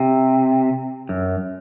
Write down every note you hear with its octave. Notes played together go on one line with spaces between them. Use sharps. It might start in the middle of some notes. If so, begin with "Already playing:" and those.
Already playing: C3
F#2